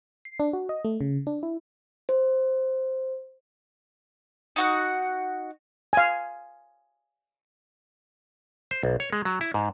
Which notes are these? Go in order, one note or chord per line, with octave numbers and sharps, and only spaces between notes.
C7
D4
F#4
D#5
A3
C#3
D4
E4
C5
D#4 F#4 F#5
F5 G#5
C5
B1
C#5
G#3
F#3
E4
G#2